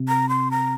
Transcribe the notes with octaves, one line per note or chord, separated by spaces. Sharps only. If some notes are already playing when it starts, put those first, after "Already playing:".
Already playing: C3
A#5
C6
A#5